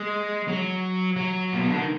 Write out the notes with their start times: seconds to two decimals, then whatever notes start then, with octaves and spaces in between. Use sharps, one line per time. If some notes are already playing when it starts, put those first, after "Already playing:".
Already playing: G#3
0.48 F#3
1.16 F#3
1.53 A#2
1.60 B2
1.69 D3
1.76 D#3